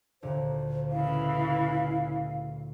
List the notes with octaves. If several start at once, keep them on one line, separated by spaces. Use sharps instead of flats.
D2 A#2 D3 C5
C#3 E3 E4 F5